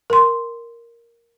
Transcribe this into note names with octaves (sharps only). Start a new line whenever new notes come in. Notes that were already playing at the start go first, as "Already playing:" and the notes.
A#4 C6